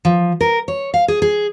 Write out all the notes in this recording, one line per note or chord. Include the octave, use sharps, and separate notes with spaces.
F3
A#4
C#5
F5
G#4
G#4